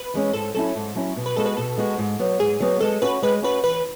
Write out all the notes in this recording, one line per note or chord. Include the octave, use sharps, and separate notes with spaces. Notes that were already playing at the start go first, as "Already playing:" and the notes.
Already playing: B4
E3 G#3 C#4
G#2 A4
F#3 C#4 E4 A4
G#2
F#3 C#4 E4
B2
B4
G#3 B3 F#4 A4
B4
B2 A4
G#3 B3 F#4
G#2
F#3 B3
G#2 G#4
F#3 B3
G#3 A4
C#4 F#4 B4
G#3 B4
C#4 F#4 B4
E3 B4